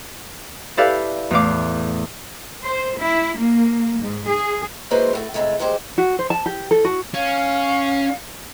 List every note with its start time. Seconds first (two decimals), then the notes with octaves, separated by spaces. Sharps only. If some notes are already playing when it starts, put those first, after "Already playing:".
0.77 E4 G4 A4 B4 D5 F5
1.31 E2 A2 F5 D6
2.62 C5
2.98 E4
3.36 A#3
4.01 G#2
4.29 G#4
4.91 G#3 A#3 E4 F#4 B4 C5
5.13 A2 A3 F#4
5.34 A2 C3 D#3 G#3 A3
5.59 D2 A#2 G#3 G4 C5
5.98 F#4
6.19 C5
6.30 A5
6.46 G4
6.71 A4
6.85 F#4
7.14 C#4 F5